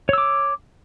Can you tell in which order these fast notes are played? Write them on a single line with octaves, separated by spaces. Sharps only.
C#5 E6 D6